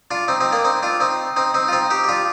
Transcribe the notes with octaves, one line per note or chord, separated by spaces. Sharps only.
D4 F4
C4 D#4
C4 D#4
A#3 D4
C4 D#4
D4 F4
C4 D#4
C4 D#4
C4 D#4
F4
C4 D#4
D#4 G4
G4
D4 F4